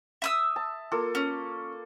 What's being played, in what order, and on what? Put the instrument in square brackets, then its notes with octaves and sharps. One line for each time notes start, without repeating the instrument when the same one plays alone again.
[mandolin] E5 D#6 E6
[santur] A5
A#3 F4 A4
[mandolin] C#4